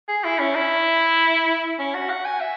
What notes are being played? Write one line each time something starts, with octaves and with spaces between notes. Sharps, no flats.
G#4
E4
C#4
E4
C#4
F#4
F#5
G#5
E5